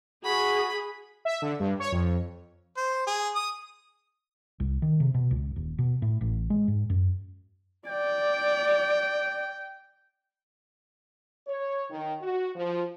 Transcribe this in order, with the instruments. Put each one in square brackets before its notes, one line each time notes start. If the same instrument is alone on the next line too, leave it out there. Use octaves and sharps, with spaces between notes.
[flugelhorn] F#4 [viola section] G#4 [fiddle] B5
[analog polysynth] E5
D3
G2
C#5
F2
[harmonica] C5
G#4
D#6
[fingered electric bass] C2
D#3
C3
B2
C#2
D#1
B2
A2
A1
G#3
G#2
F#2
[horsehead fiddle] D5 [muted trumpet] G5
[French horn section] C#5
D#3
F#4
F3